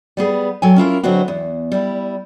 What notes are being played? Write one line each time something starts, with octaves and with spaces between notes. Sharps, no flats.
G3 B3 G#4
F#3 A4 G5 G#5
C#4 E4 F4 A#4
D3 F#3 G#3 B3 C4 F#4
E2
G3 E4